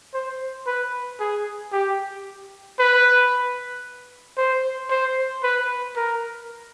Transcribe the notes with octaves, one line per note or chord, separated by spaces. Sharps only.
C5
B4
G#4
G4
B4
C5
C5
B4
A#4